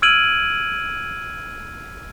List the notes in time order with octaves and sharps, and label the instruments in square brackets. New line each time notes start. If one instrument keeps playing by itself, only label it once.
[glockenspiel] E6 F6 G#6 D7 D#7 F#7